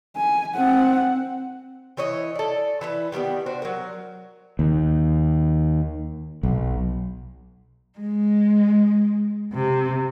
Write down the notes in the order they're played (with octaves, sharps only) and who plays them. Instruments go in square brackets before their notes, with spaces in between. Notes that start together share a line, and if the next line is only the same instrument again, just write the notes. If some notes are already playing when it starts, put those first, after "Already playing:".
[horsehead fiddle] G#5
C4 F#5
[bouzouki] E3 E4 C#5 D#5
A4 D5
E3 E4 B4
D#3 G3 A#3 B3
D4 F#4 C5
F#3 A#4
[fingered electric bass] D#2
B1
[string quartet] G#3
C3